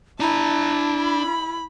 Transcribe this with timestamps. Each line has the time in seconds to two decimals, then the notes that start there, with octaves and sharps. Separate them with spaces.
0.20 D4 E4 A5 A#5
1.01 B5